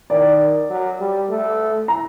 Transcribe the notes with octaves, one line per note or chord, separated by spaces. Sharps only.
D#3 D5
F#3
G3
A3
A#5